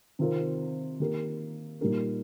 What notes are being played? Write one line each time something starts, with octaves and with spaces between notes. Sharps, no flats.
C3 D#3 C4 F4 A#4
D#3 A#3 G4 A#4
A#2 G3 D#4 G4 A#4